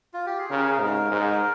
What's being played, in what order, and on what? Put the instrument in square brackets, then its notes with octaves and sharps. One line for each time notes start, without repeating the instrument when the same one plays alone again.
[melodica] F4
G4
G#4
[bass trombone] C#3 [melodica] A#4
[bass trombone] G#2
G#2